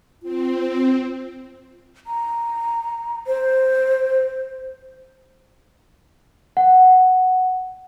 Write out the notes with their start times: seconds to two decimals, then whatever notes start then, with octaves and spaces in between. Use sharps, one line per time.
0.23 C4 F4
2.07 A#5
3.27 C5
6.57 F#5